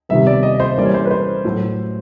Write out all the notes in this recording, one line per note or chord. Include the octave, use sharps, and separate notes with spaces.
C3 D#3 G3 B3 E5
D5
D#5
C5
E3 G3 A#3 C#4 D5
C#5
C5
B4
C5
A2 F#3 A3